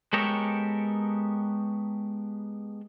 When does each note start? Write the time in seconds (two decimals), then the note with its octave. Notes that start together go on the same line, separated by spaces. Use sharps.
0.13 G#3 B3 G4 A4 A#4 C#5